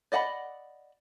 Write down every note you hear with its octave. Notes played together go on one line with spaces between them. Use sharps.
D5 D#5 F#5 G#5 B5